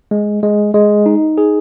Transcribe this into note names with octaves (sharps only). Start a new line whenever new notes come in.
G#3
G#3
G#3
D#4
G#4